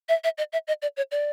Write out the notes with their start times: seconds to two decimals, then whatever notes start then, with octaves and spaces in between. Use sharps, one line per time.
0.09 E5
0.24 E5
0.38 D#5
0.53 E5
0.68 D#5
0.82 D5
0.97 C#5
1.12 D5